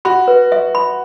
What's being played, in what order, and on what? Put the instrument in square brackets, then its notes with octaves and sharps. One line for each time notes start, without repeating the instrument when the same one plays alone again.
[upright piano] F#4 [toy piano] B5
[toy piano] B4
E5
B5